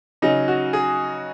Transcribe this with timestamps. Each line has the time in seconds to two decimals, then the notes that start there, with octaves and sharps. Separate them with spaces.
0.22 C#3 F#3 D#4
0.48 F#4
0.73 G#4